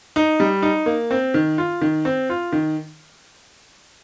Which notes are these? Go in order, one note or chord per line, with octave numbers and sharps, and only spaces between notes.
D#4
G3
D#4
A#3
C4
D#3
F4
D#3
C4
F4
D#3